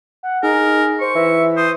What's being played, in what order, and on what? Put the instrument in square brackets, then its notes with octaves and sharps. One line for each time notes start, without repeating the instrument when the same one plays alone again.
[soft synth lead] F#5
[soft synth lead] D#4 [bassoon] G#4 [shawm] A#4
[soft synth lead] C5 [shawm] C#6
[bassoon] E3 [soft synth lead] E5
[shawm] C5 [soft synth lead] D#6